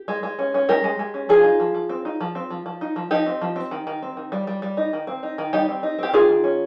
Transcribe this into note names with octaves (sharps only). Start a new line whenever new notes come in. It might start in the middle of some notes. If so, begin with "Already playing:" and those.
Already playing: G4
G#3
G#3
C#4
C#4
G#3 G4 A#4
G#3
G#3
C#4
F3 F4 G#4
D#4
F3
F3
C4
D#4
F3
C4
F3
F3
D#4
F3
F3 D#4 G4
C4
F3
C4
D#3
D#3
C4
D#3
G3
G3
G3
D#4
D#3
C4
D#4
D#3
G3 D#4 G4
C4
D#4
C4 G4
D#3 F4 G#4
D#3
C#4